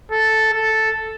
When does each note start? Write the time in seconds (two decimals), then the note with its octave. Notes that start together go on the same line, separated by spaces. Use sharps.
0.11 A4
0.53 A4